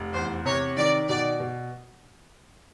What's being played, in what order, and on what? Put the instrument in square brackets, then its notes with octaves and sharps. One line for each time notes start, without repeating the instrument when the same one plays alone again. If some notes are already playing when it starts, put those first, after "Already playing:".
Already playing: [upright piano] F1
[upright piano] E2 [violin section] C5
[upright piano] C3 [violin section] C#5
[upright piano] D#3 [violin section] D5
[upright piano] B2 [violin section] D5
[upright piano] B2